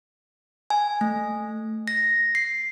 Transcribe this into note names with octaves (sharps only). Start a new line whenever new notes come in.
G#5
A3
A#6
C7